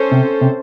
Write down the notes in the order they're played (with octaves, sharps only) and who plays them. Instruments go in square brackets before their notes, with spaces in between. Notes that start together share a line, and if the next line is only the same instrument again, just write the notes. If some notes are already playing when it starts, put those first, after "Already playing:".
Already playing: [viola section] C#4 A4 C5
[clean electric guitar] C3
C3